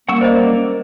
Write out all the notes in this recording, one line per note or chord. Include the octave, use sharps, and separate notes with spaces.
G3 A#3 C#4 F#5 C#6 E6
A#4 C5 D5 D#5